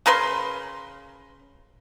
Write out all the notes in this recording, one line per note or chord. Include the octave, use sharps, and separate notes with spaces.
C#3 A#4 B4 C6